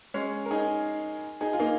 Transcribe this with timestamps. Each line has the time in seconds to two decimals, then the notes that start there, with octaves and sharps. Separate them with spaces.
0.14 G#3 C#4
0.46 A#4
0.51 D#4 G#4
1.41 D#4 G#4
1.53 F4
1.60 A#3 D#4